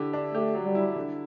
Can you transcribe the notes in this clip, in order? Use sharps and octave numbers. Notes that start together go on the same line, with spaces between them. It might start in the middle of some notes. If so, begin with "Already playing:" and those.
Already playing: D3 E4 G4
D4
A3 G4
F#3
G3
E4
D3